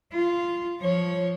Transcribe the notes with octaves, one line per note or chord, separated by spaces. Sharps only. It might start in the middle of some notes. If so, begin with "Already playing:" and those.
F4
F3 C#5